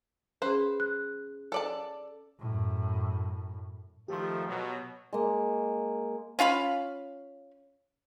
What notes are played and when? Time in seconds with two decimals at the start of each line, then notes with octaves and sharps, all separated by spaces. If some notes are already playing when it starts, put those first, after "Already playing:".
0.42 C#4 G#4 B4 C5
0.80 F#6
1.52 A4 D5 A5
2.39 F#2 A2
4.08 D#3 F3 A3 G4 C6
4.47 B2 F#3
5.13 G#3 A#3
6.39 C#4 F4 F5 B5